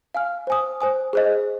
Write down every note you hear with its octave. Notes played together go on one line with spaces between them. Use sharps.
F5 G#5 F6
C5 G#5 D#6
C5 G#5 D#6
G#4 C5 D#5